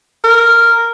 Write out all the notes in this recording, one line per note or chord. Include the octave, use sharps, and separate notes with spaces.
A#4